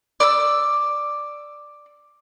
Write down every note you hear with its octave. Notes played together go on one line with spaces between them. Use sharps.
D5 D6 E6